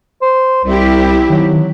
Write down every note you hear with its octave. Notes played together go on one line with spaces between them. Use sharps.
C5
C2 C4 E4 G4
D#3 F#3